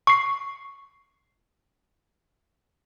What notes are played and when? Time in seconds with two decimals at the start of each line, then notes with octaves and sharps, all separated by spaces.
0.07 C#6 C7